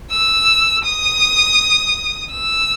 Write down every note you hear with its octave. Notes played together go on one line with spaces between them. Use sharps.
E6
D#6
E6